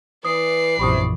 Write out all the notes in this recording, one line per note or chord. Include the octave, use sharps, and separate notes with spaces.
E3 B4 D5 D#6 C7
A#1 F#2 C3 E3 B5 C#6 D#6